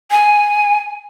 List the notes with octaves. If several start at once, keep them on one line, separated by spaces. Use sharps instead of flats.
G#5